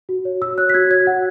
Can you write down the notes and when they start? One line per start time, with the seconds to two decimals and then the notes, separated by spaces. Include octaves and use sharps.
0.09 F#4
0.25 C#5
0.42 F#4 E6
0.58 C#5 F#6
0.69 B6
0.74 F#4 G#6
0.91 C#5 G#6
1.07 F#4 F#5